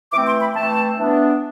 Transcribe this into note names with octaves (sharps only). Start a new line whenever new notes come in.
E3 A3 C4 D6
C6
B5
E3 A3 C4 A5
E3 B3 D4